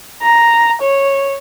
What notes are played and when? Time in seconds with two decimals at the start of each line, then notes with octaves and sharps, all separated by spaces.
0.22 A#5
0.81 C#5